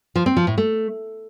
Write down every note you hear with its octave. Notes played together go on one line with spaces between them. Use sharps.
F3
C4
F3
A2
A3